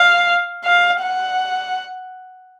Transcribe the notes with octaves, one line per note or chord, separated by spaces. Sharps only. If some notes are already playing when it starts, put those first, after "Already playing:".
Already playing: F5
F5
F#5